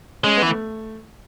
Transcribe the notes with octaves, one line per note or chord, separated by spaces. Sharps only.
G#3 C#4
B3
E3
A3